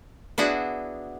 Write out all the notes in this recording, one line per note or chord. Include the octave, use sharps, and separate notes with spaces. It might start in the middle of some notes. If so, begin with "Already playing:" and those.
B3 D4 E4 F#4 G#4